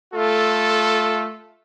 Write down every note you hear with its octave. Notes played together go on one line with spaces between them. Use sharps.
A3 F4 A4